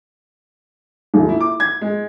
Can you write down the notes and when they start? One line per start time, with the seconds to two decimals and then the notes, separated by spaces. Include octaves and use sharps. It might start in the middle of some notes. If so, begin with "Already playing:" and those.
1.14 D#1
1.29 E4
1.40 D6
1.60 G#6
1.81 G#3